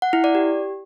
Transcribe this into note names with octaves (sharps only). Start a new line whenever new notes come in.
F#5
E4
D5
G4